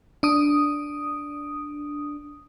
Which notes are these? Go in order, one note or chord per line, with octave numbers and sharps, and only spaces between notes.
D4 D#6